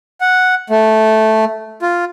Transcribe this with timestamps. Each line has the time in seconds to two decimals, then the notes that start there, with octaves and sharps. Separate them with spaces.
0.21 F#5
0.70 A3
1.82 F4